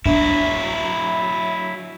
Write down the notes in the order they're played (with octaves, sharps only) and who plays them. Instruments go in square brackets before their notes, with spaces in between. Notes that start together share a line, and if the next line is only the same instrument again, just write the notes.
[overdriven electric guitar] F#3 E4 [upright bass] D4 [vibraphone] E5